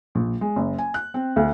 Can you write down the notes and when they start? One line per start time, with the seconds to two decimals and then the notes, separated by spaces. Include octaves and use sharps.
0.15 A#1
0.41 G#3
0.56 F#1
0.78 G#5
0.94 F#6
1.14 C4
1.36 D2